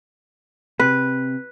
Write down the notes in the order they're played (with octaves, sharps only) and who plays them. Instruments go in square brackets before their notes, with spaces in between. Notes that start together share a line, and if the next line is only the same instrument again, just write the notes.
[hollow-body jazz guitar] C3 [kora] B4